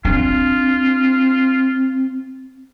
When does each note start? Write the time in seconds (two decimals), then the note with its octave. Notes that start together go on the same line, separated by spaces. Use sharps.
0.05 C4 D4 F4